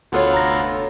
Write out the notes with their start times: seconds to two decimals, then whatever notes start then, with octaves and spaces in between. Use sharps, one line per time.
0.12 D2 B3 F4 F#4 A4 C#5
0.33 F1 A#5 A#6